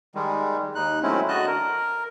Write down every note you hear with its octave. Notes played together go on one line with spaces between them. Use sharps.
D#3 G3 G#3
D#2 D#4 F#6
F#3 G#3 A3 C4 C#4 E4
D3 F#4 D#5 A5 F#6
A#4